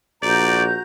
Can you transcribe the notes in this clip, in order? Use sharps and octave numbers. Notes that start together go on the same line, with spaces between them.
A#1 F#4 D5 A#5 G6